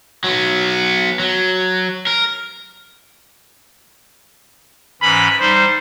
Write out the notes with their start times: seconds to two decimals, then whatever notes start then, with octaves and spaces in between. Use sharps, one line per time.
0.24 F#3 B3
1.19 F#3
2.07 A#4
5.01 G#2 E3 C#4 B5
5.40 G3 D#4 C5